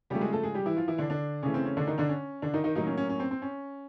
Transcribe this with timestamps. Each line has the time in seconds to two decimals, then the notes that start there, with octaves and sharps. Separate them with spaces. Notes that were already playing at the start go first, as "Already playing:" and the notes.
0.10 C#3 F3 G3 A3 G4
0.21 G#3 G#4
0.33 A3 A4
0.43 G#3 G#4
0.54 G3 G4
0.66 E3 E4
0.77 F3 F4
0.88 E3 E4
0.98 D3 D4
1.10 D3 D4
1.43 C#3 E3 A3 C#4
1.54 C4
1.66 C#4
1.77 D3 D4
1.87 D#3 D#4
1.98 D3 D4
2.09 C#4
2.42 D3 D4
2.54 D#3 D#4
2.64 D#3 D#4
2.75 A2 D#3 F#3 A#3 D#4
2.86 C#4
2.97 C#4
3.09 C#4
3.20 C4
3.31 C4
3.42 C#4